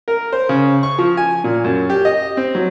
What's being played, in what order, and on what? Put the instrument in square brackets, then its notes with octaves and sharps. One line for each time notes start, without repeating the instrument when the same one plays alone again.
[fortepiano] A#4
C5
C#3
C#6
F3
G#5
A#2
F#2
G4
D#5
C4
F#3